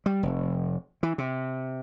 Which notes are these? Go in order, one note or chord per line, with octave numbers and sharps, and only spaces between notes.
G3
F1
E3
C3